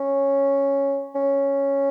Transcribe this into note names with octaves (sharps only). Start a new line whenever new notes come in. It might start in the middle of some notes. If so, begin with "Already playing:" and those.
Already playing: C#4
C#4